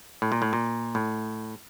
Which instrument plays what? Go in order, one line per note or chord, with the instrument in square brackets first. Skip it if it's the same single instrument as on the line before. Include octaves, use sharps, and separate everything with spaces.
[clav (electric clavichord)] A2
A#2
A2
A#2
A2